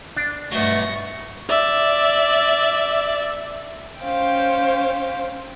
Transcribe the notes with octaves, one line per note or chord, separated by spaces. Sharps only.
D4
G2 F#3 A3 B3 C#6 A#6
D5 E5
C#4 C5 F5 G5